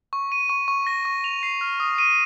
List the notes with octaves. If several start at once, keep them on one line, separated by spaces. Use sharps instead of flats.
C#6
D#7
C#6
C#6
A#6
C#6
F7
C7
F6
D#6
D#7